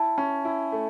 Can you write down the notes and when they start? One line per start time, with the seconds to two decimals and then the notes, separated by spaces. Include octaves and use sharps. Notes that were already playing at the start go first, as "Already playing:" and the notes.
Already playing: E4 A5
0.18 C#4
0.45 E4
0.72 A3